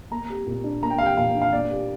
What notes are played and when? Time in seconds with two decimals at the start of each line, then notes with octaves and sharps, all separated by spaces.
0.11 A#3 A#5
0.29 G4
0.47 A#2
0.64 D4
0.82 A#3 A#5
0.90 G5
0.98 G4 F5
1.06 G5
1.17 A#2 F5
1.35 D4
1.42 F5
1.53 A#3 D5
1.70 G4